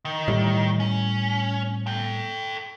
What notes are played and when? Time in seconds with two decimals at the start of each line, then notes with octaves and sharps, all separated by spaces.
0.05 D#3
0.28 A2 G3
0.80 C#4
1.87 A4 G5